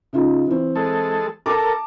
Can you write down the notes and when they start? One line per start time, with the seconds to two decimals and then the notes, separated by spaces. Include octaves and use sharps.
0.13 C#3 D#4 F4
0.47 E3 C4
0.75 G#3 A4
1.46 A4 A#4 A5 D6